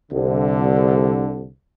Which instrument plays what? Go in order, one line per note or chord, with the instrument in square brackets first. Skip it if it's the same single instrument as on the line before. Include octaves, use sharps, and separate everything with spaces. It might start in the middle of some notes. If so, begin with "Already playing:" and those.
[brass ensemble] C2 D3